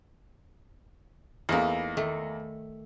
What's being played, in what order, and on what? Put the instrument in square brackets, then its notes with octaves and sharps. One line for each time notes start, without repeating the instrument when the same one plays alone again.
[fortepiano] E2 A#3 [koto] E3 A3 D#4
[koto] D#3 A3